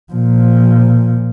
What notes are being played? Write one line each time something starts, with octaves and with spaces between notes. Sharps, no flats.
A#2 F3